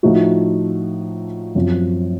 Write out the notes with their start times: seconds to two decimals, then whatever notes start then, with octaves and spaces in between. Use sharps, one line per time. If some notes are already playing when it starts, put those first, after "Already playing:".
0.03 A2 F3 A3 D#4 F#4
1.55 F#2 F3 C4